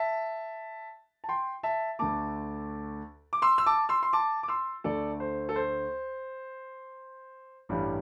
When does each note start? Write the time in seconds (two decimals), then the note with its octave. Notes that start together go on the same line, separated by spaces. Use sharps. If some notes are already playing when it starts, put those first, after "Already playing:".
Already playing: E5 A5
1.24 A5
1.29 G5 C6
1.63 E5 A5
1.99 D2 D3 A3 A5 D6
3.33 D6
3.42 C6 E6
3.58 E6
3.66 A5 D6
3.89 C6 E6
4.03 C6
4.13 A5 D6
4.43 D6
4.48 C6 E6
4.84 D2 D3 A3 A4 D5
5.20 C5
5.49 A4
5.56 C5
7.69 A1 G2 G3